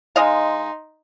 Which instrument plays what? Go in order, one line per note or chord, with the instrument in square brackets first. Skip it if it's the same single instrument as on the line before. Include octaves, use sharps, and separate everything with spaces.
[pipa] G#3 D#5 F5 [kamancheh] D#4 C6